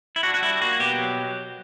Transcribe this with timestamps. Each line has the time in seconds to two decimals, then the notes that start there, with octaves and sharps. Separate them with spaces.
0.16 E4
0.23 D4 F#4
0.34 F#4
0.42 G3 E4
0.61 A#3 F#4
0.80 B2 G4
0.99 F#3